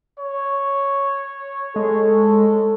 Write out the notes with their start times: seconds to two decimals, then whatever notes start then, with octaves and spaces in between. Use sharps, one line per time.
0.18 C#5
1.76 G#3 A4